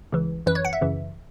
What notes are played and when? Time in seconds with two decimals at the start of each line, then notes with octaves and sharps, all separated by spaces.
0.12 C#2 C#3 E3
0.46 F#2 E3 B4
0.55 C#5
0.65 F#5
0.73 E5
0.81 F#2 C#3 E3